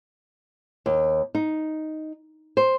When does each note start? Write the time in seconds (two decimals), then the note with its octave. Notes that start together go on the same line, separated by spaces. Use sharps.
0.86 D#2
1.35 D#4
2.57 C5